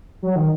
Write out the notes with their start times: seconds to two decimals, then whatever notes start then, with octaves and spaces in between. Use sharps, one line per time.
0.22 F#3
0.36 D#3